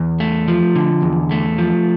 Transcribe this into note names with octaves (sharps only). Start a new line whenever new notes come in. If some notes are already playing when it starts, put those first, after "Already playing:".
Already playing: E2
A3
F3
D3
E2
A3
F3